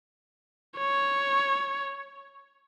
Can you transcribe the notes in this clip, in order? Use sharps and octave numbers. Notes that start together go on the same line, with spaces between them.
C#5